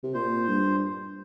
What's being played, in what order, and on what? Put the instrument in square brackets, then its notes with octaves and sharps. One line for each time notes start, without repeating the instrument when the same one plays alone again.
[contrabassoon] C3
[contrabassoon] A#2 [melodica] C5
[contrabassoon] G2